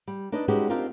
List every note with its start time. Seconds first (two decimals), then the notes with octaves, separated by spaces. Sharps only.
0.07 G3
0.32 D4 D#4 B4 D#5
0.48 G3 G#3 C#4 D#4 F#4 G4
0.70 C4 D4 D#4 F4 G4 A#4